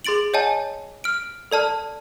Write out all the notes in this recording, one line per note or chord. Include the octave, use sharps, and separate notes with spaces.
G#4 C6 A6 D7 F#7
C#5 D#5 F#5 G#5 A5
F6 D7
A4 D5 A5 F6